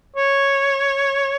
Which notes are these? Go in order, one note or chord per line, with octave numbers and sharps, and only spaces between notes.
C#5